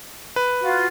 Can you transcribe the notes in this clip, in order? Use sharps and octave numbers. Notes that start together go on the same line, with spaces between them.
B4
F4 F#4